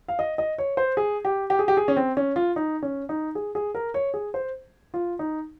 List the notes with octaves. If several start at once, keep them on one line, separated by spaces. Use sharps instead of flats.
F5
D#5
D#5
C#5
C5
G#4
G4
G4
G#4
G4
G#4
C#4
C4
C#4
F4
D#4
C#4
D#4
G#4
G#4
A#4
C#5
G#4
C5
F4
D#4